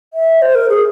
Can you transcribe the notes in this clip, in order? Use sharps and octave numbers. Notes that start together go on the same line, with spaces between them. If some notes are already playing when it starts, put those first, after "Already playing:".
E5
C5
A#4
G#4